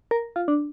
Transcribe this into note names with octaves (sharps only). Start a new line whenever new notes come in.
A#4
F4
D4